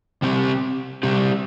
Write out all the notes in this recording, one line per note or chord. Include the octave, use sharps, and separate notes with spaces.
C3 G3 C4 G4
C3 G3 C4 G4